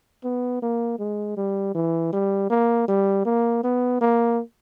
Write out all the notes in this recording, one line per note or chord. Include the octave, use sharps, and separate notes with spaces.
B3
A#3
G#3
G3
E3
G3
A#3
G3
A#3
B3
A#3